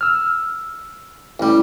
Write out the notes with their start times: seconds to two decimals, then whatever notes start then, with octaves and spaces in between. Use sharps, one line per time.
0.01 E6 F6
1.40 A1 G3